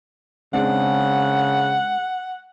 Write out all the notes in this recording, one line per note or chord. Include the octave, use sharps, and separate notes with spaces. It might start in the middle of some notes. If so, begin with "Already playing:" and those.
C#3 G#3 C4 D4 F#5